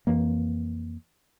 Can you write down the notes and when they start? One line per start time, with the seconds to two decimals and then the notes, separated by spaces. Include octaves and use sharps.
0.07 F2 E3 A#3